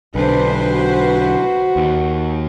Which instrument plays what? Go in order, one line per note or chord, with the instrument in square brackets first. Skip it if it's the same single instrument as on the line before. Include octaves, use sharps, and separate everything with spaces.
[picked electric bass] B1 D3 [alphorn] D4 [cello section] B4 C5
[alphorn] F#4
[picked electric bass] D#2